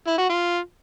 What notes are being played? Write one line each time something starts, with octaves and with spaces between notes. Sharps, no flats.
E4
F#4
F4